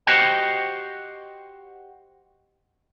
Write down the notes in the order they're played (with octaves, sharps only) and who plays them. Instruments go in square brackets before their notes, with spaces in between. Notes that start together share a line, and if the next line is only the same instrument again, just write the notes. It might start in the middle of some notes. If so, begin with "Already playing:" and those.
[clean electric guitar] F#4 G4 C5 D#5 F#5 G5